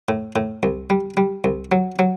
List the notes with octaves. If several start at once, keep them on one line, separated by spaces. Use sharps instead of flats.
A2
A2
C2
G3
G3
C2
F#3
F#3